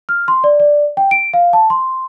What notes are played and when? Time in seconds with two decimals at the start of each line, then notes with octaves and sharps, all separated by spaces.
0.09 F6
0.28 C6
0.44 D5
0.60 D5
0.97 G5
1.11 D7
1.34 F5
1.53 A5
1.70 C6